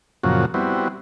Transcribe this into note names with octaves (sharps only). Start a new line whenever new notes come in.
F#2 A#2 C#3 F3 F#4
G3 B3 C4 E4 F#4